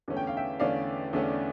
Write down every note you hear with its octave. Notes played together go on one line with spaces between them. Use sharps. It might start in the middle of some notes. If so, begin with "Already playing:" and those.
E2 D3 A3 C#4
G5
F5
E5 G5
E2 D3 A3 C#4 D5 F5
E2 D3 A3 C#4